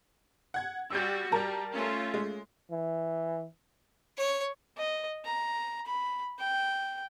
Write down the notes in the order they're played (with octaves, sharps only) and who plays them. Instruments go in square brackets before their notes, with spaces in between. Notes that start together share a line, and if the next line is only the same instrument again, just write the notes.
[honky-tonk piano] F#5 G#6
[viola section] G3 F#4 [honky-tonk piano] E6 G6
[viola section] G3 [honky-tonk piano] A#4 A5 A#5
[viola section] A3 C#4 F4
[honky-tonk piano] G#3
[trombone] E3
[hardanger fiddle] C#5
D#5
A#5
B5
G5